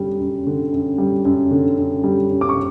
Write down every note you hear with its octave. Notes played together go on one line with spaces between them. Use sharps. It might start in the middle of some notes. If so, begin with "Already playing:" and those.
Already playing: F#2 D3 G3
F#2
D3
F#2
G3
F#2
D3
F#2
G3
F#2
D6
C#6